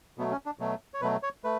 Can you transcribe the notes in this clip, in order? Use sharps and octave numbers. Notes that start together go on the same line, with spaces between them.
B2 F#3 A3 B3
C#4
D4
B2 F#3 A3
C#5
B2 F#3 A3 B4
C#5
A3 B4